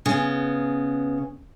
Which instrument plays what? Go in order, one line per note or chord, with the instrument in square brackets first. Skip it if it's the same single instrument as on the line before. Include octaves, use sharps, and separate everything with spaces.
[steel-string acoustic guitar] C#3 B3